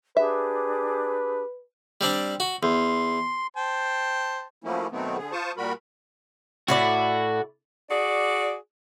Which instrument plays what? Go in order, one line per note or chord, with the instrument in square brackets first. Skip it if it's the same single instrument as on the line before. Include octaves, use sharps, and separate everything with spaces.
[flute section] D4 G4 G#4 [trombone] B4 [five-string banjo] E5
[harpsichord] G3 C4 D4
F#4
[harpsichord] E2 [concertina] C6
[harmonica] C5 G5 A5
[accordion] F3 F#3 A3 A#3 C#4 E4
B2 D#3 F#3 A3 B3 C4
D3 G#4
F4 C5 A5 C#6 D#6
A#2 G3 F#4 A#4 B5
[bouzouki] A2 E4 D5 [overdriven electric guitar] F#4
[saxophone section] F#4 G#4 D5